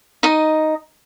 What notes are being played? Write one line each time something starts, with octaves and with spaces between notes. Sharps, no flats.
D#4 D#5